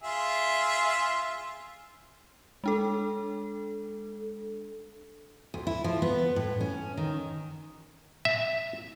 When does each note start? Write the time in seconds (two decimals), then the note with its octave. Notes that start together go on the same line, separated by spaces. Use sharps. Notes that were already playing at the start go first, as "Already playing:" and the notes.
0.03 F4 G#4 E5
2.64 G#3 D4 A4
5.54 D2
5.67 E4
5.84 F3
6.02 B3
6.36 A2
6.61 C#4
6.97 D#3
8.25 E5